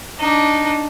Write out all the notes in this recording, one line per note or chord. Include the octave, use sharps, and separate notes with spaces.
D4 D#4